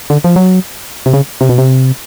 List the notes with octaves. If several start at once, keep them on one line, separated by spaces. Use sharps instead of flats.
D3
F3
F#3
C3
C#3
C3
B2
C3